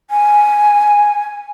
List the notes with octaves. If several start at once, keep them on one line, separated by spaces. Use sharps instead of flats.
G#5